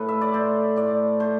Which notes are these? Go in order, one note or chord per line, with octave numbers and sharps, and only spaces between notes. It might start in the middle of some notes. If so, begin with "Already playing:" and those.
Already playing: A2 A3 A4 B4
E5
D5
A2 C5
A2 D5
A3 C5